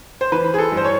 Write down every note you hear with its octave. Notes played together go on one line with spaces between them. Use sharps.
C5
E3 B4
G#4
A4
G2
C5
C#5